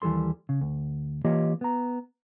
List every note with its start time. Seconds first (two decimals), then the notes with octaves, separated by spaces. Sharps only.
0.02 D#2 E3 G3 A4 C6
0.49 C#3
0.61 D2
1.24 E3 A#3 F4 G4 C#5 D#5
1.61 B3 A#5